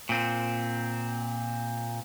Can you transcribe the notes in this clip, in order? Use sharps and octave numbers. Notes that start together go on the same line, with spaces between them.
A#2 C4